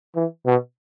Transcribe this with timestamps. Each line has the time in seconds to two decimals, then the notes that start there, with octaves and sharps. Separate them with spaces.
0.16 E3
0.46 B2